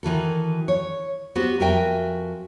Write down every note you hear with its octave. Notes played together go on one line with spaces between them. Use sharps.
D#3 E3 F#4 A4
C#5
B3 F#4 G4 C5
F2 F#4 A#4 E5 G5 G#5